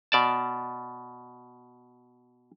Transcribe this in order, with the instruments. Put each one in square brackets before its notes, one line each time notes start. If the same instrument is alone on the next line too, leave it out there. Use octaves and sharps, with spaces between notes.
[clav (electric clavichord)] B2 D5 A5